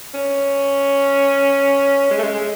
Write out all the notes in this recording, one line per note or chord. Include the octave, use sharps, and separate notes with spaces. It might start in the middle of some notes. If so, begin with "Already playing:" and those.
C#4
G#3
A3
G#3
G#3